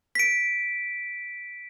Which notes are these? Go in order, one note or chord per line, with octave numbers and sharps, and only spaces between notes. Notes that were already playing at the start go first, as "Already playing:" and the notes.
B6 D7